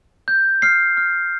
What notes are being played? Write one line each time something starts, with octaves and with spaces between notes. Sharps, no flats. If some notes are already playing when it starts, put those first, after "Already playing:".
G6
F6 C7
F6